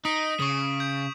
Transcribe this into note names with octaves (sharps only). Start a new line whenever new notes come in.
D#4 D#6 B6 D7
C#3 C#6 D#6
G6